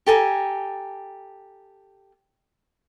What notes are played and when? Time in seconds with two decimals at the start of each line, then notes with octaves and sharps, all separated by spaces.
0.06 G4 A4 G#5 A#5